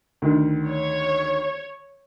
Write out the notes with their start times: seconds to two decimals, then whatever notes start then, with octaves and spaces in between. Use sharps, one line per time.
0.22 D2 D#3
0.68 C#5